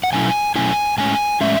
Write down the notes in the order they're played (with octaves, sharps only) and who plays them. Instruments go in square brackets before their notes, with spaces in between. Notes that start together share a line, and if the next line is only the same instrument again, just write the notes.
[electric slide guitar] F#5
B2 F#3 A3 C#4 E4 G#5
B2 F#3 A3 C#4 E4 G#5
A2 G#3 C#4 G#5
A2 G#3 C#4 E5